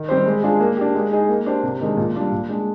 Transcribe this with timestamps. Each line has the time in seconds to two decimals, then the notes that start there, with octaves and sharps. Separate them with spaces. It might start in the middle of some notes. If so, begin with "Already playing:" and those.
Already playing: D#3
0.09 G3 C4 G4 C5
0.26 G#3
0.43 D4 F4 G#4
0.60 A#3
0.77 D4 G4
0.95 G#3
1.12 D#4 G#4 D#5
1.29 A#3
1.46 D4 G4 C5
1.63 C3
1.81 D#3 G#3 D4
1.97 A#2
2.14 G3 D4 F4
2.32 A#2
2.49 G#3 D4